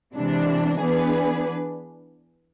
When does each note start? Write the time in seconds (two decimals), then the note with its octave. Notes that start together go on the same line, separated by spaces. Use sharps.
0.14 C3 E3 G#3 D4
0.80 E3 B3 D4 G#4 B4